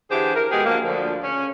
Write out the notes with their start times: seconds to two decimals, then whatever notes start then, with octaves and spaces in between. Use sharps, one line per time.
0.11 D3 E3 G4 G#4 C5
0.35 A#4
0.51 B2 G#3 B3 G4 G#4
0.66 D3 F3 F#3 A#3
0.85 D2 D3 F3
1.24 C#3 C#4